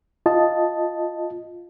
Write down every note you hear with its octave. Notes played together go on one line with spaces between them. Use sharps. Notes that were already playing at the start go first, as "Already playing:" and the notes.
F4 D#5 A5